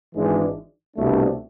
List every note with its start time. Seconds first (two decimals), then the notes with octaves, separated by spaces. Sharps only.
0.15 G#1 G#2 E3 G#3 D4
0.96 C2 B2 A3 D4